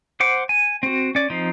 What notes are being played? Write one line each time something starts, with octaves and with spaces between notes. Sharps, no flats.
C5 F#5 D6
G#5
C4 F#4
C#4 D5
F3 C4 D#4